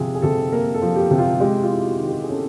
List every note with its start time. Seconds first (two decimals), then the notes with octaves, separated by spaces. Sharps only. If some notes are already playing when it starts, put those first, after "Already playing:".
Already playing: C3 F3 G#4
0.14 G#4
0.22 C3 A4
0.52 A#3 A#4
0.74 A4
0.82 F3
0.96 G4
1.11 C3
1.19 F4
1.40 G#3 G4
1.63 F4
1.71 E4
1.85 F#4
1.99 D#3
2.07 G4
2.23 G#4
2.29 C#4 A4